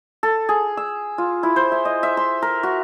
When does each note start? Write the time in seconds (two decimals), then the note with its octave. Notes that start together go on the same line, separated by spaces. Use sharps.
0.23 A4
0.49 G#4
0.77 E6
1.18 F4
1.43 E4
1.56 C5
1.72 E5
1.85 D#5
2.03 E5
2.17 C6
2.42 A#4
2.63 F#4